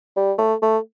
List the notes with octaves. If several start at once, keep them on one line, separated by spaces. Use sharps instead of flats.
G3
A3
A3